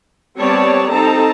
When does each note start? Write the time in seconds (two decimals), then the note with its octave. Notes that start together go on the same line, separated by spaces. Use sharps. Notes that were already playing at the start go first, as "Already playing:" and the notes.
0.39 G3 B3 C4 C#5 D5 A5
0.91 C4 D#4 A4 A5 A#5